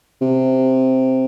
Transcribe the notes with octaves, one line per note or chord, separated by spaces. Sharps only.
C3